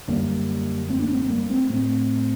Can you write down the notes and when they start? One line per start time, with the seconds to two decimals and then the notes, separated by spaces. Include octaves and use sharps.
0.08 F#2 D3 G3 A#3
0.89 A3 C4
0.99 A#3 D4
1.09 A3 C4
1.19 A3 C4
1.30 G3 A#3
1.50 A3 C4
1.69 A2 A3 C4